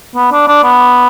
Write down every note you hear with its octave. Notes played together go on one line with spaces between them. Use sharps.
B3
D4
D4
B3